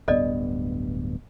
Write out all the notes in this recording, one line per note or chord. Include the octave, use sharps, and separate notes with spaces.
D1 G2 B3 A4 D5 D#5